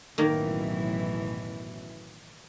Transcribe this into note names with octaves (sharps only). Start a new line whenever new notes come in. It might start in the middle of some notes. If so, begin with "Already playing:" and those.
A1 F#2 B2 D#3 E3 A#3